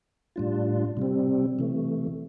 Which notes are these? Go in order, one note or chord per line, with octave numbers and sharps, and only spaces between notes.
A2 G3 D4 F4
C3 G3 C4
C3 E3 A3